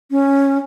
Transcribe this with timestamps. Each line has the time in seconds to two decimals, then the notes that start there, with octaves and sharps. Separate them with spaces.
0.11 C#4